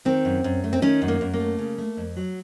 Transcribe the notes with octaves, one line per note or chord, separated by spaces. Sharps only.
D#3 C4
F#2
F#2
A3
C4
D#3 C#4
F#2
A#3
F#2
A#3
A3
C#3
A3
F2
F#3